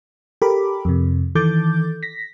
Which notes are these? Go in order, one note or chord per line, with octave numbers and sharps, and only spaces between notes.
G4 A4 A#4 B5 D6
F2 C3
D#3 E3 A4 D6 G6 A6
A#6 B6